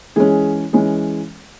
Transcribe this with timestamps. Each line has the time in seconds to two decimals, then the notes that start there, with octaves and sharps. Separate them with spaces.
0.16 E3 G#3 C#4 G#4
0.73 E3 G#3 C#4